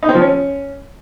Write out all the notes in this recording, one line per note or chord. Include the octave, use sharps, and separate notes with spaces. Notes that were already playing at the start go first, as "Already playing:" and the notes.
D#4
C4
F3
C#4